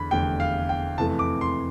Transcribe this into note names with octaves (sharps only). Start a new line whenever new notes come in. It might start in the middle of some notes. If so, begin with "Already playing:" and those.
Already playing: E2 D3 B5
F1 E2 D3 G5
F5
G5
F2 C3 E3 A3 A5
D6
C6